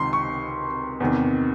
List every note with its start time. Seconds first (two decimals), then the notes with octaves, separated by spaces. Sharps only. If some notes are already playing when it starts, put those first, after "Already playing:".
Already playing: C#2 C3 D#3 C6
0.13 C#6
1.00 E2 C3 D#3